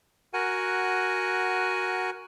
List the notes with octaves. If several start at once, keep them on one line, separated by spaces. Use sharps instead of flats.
F#4 A#4 F#5 G#5